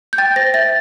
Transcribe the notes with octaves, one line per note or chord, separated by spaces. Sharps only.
G6
G5 A6
C5 A#6
E5 A6